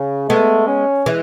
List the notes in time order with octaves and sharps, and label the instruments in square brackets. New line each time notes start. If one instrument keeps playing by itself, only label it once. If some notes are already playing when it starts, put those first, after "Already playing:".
Already playing: [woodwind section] C#3
[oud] G#3 B3 [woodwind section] A3
[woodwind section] C#4
[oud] E3 G#3